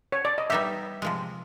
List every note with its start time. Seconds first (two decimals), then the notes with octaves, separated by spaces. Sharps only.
0.12 C#5
0.25 D5
0.38 D#5
0.50 G3 B3 D#4 G4 E5
1.02 C3 F3 G#3